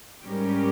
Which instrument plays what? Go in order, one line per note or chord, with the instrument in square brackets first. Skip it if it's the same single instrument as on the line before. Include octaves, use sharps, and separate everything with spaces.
[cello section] G#2 G3 C#4 G4 A#4